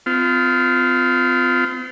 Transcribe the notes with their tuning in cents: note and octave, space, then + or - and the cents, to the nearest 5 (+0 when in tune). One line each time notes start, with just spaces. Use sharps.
C4 -45 F4 +0